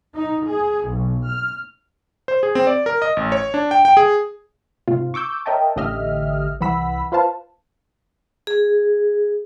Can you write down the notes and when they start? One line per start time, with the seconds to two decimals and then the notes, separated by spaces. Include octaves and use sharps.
0.15 D#4
0.47 G#4
0.86 B1
1.27 F6
2.28 C5
2.43 G#4
2.55 C4
2.67 D5
2.86 A#4
3.02 D#5
3.17 A1
3.32 C#5
3.54 D4
3.71 G5
3.85 G5
3.97 G#4
4.88 G#2 C3 F4
5.14 C#6 D6 E6 G6
5.46 A#4 C#5 D#5 E5 G5 A5
5.76 A1 D3 G4 D#5 E5 F6
6.60 C2 E3 F#5 B5 E6 B6
7.12 F4 B4 C5 F5 A5
8.47 G#4